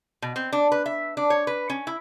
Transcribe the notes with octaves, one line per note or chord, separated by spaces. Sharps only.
B2
C4
D4
B4
E5
D4
C#5
B4
C#4
E4